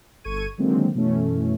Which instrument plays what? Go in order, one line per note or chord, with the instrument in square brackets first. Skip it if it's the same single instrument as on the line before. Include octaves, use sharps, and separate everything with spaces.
[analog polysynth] G1 A4 C#6 G#6 D#7
D3 D#3 F#3 G#3 A#3 C4
F#2 B2 E3 A3 C#4